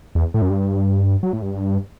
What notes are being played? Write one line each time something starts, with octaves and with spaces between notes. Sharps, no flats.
E2
A2
F#2
G2
F#3
A2
G2